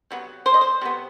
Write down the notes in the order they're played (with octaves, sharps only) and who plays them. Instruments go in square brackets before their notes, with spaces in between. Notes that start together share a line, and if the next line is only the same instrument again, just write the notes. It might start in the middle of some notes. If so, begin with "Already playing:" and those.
[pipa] C3 F#3 B3
C5
D#5
C5
C3 F#3 B3